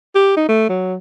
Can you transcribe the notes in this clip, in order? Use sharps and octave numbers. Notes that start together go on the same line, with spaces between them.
G4
D#4
A3
F#3